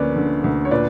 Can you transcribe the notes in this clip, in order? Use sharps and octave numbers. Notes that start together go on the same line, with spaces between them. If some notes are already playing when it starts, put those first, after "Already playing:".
Already playing: D2 A#3 C#4 B4 D5
D3
D2
C#5
A#2 B4 D5